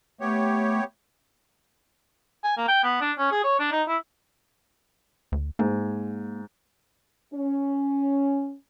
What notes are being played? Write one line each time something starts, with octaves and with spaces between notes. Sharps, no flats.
A3 B3 G4 C#5
G#5
A#3
G5
B3
D4
C#4
G#4
C#5
D4
D#4
E4
D2
G#2 A#3
C#4